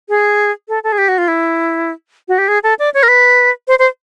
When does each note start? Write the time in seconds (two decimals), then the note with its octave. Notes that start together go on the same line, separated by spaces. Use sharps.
0.09 G#4
0.69 A4
0.84 A4
0.92 G#4
0.98 G4
1.08 F#4
1.18 F4
1.28 E4
2.28 F#4
2.38 G4
2.48 G#4
2.63 A4
2.79 D5
2.94 C#5
3.03 A#4
3.08 B4
3.68 C5
3.79 C5